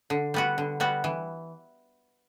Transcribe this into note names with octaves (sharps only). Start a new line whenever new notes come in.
D3
G3 B3 F#4
D3
G3 B3 F#4
E3